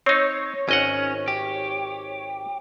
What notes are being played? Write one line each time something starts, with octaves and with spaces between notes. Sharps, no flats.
C4 D#4 C#5
G#1 C#4 D#5 F#5
G4